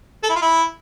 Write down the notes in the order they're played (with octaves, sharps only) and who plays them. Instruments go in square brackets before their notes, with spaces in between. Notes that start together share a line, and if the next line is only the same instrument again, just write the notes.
[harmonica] A4
E4
F4
E4